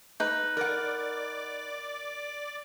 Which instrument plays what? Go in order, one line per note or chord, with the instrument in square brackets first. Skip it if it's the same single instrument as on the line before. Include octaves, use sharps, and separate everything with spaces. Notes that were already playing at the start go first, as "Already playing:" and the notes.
[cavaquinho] D#4 B4
[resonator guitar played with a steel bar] A#4 F#5 [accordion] D5 D6